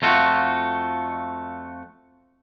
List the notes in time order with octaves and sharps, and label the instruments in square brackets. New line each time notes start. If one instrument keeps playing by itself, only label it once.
[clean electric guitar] F2 A3 F4 F#4